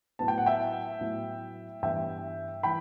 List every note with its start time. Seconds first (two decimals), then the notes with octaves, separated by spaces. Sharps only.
0.19 A2 F#3 B3 E4 A5
0.28 G5
0.38 F#5
0.46 E5 G5
1.00 A2 F#3 B3 E4
1.82 G2 E3 B3 E5 G5
2.63 E3 G5 B5